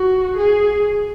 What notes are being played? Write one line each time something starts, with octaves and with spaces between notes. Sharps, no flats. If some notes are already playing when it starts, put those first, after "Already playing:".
Already playing: F#4
G#4